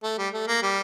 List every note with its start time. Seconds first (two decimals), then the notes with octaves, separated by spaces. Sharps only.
0.03 A3
0.18 G3
0.33 A3
0.47 A#3
0.62 G3